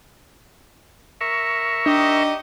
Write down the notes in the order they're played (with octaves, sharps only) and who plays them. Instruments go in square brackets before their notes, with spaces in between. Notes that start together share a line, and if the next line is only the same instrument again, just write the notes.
[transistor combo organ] A#4 E5 C#6
[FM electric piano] D4 [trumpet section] D#4 G4 D#5